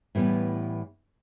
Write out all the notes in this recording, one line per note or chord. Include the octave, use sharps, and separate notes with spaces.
A2 E3 G3 B3